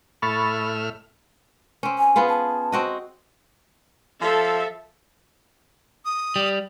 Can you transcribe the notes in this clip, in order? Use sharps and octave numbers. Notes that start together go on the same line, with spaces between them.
A2 E5 B5 C#6 F6 A6
C4 C#4
G#5
B3 F4 G#4
A5
C4 F#4 D#5
F3 A4 E5
D#6
G3